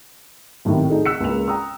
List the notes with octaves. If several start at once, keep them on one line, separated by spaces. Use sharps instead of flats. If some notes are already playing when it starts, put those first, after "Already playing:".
B1 A2 C3 D#3
A3 D#4 G#4 A4
E6 F#6 B6 C#7
C#2 G#3 A#3 F7
G5 A#5 D#6 E6